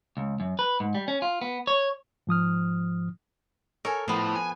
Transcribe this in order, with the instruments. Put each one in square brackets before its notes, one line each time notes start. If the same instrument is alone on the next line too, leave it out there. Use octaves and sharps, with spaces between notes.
[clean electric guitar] C#2
F#2
B4
G#2
G3
C#4
F4
B3
C#5
[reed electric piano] G#2 F3 D#6 F6
[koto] A4 A#4 [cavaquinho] C#5 G#5
[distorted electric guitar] A2 [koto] F3 B3 [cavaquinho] C5
[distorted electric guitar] G#5